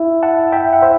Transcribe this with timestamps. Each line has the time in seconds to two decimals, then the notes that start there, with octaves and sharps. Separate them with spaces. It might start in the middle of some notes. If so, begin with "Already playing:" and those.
Already playing: E4
0.23 F#5 A5
0.52 E5 G5
0.73 F#5
0.82 C5 E5